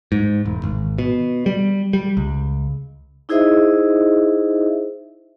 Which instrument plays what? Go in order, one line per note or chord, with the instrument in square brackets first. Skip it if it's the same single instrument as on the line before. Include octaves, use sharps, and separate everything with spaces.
[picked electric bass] G#2
E1
G#1
B2
G3
G3
C#2
[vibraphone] D#4 E4 G#4 C5 D#5 E5